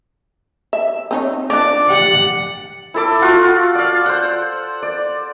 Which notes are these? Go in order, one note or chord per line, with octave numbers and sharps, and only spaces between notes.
E5
C4 D#4 C#5
F3 D4 D5
G4 F#5
E4 A4 D6
F4 F#4
D5 F5
C5 F#5
D5